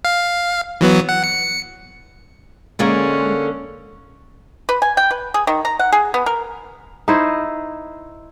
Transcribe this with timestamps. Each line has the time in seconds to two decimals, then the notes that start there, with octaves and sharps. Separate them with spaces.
0.05 F5
0.81 E3 F#3 B3
1.09 F#5
1.24 C#7
2.79 D3 G#3 A#3 C#4 G#4
4.69 B4
4.82 G#5
4.97 G5
5.11 B4
5.34 G#4
5.47 D#3
5.65 A#5
5.79 F#5
5.92 G#4
6.14 B3
6.26 A#4
7.08 D#4 E4 C5